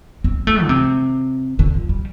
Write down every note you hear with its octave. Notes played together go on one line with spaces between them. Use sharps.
C4
A3
D3
C3
D3
F3
G3